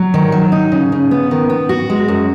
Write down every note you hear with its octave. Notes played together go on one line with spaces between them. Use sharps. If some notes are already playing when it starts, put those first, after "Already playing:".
Already playing: F#3
D#3
F#3
D#4
C#3
C#3
B3
D#3
B3
F#4
G#3
F#2